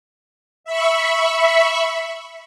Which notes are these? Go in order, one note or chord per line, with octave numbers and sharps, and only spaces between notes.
E5 B5 C#6